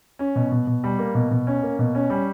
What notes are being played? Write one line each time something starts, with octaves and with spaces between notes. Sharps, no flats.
C#4
B2
B2
B2
G3
A#3
B2
B2
C#4
A#3
B2
C#4
G3